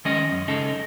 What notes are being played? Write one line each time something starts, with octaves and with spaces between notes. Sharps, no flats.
D#3 G#3 C#4 G#4 D#5
F#2
C#3 G#3 D#4 A4